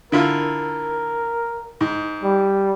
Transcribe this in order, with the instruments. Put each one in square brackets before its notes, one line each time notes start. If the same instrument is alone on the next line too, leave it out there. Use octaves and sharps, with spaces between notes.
[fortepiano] D3 E4 F4 [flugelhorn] A#4
[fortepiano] G#2
[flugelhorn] G3